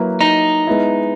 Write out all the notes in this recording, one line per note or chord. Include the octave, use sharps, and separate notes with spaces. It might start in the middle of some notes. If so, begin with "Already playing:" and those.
Already playing: F#3 A#3 E4 B4
D#4
G#3 B3 E4